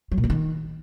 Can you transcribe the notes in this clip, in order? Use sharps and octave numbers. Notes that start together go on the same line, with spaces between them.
F#3
A#2
D3
D#3